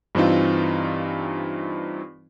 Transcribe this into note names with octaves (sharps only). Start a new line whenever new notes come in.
G2 E3 C4 D#4 F4